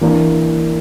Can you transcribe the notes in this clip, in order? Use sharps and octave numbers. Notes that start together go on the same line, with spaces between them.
E3 A#3 D4